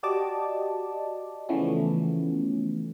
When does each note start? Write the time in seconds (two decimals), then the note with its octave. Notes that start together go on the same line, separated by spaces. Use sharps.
0.03 F#4 G4 D5 D#5 A5 D6
1.49 C#3 E3 F3 A3 B3 C#4